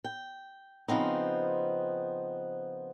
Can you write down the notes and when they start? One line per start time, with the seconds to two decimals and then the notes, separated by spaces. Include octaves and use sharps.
0.04 G5
0.88 C#3 F3 B3 C4 D#4